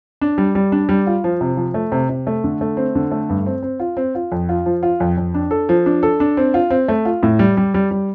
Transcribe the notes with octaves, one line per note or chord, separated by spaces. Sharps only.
D4
G3
G3
D4
G3
F4
F3
C3
F3
A3
C3
C3
A3
D3
A3
C4
D3
A3
G2
C4
C4
F4
C4
F4
F2
F4
F3
F4
F2
F2
D4
A4
F3
D4
A4
D4
C4
F4
C4
A3
F4
A2
G3
G3
G3
G3